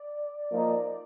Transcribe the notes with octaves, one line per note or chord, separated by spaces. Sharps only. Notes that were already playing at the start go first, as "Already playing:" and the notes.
Already playing: D5
F3 A#3 D#4